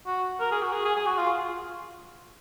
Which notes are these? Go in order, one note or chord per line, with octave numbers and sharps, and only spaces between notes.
F#4
A#4
G#4
F#4
G#4
G#4
G#4
F#4
F4